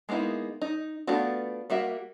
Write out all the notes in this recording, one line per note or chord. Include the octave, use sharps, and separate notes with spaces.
G#3 A#3 B3 D#4 E4
D#4
A3 B3 D4 F4 F#4
G3 A#3 F#4 E5